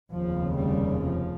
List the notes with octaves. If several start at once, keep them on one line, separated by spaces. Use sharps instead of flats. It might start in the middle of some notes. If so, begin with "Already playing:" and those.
F1 D#2 C#3 F3
G3
F3